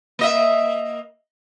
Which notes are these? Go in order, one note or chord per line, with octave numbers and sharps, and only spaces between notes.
A#3 D#5 E5